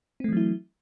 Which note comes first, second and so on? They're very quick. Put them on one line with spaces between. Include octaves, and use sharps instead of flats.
C4 A3 E3 F#3 E4